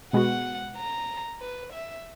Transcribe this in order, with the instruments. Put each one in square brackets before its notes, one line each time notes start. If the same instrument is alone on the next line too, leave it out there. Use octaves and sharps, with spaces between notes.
[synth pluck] B2 G#3 B3 F#4 [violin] F#5
[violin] A#5
B4
E5